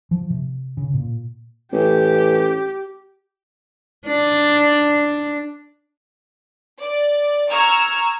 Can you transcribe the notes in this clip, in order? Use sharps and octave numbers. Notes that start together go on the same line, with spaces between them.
F3
C3
C#3
A#2
A1 G4
D4
D5
A#5 C#6 E6 F6 G#6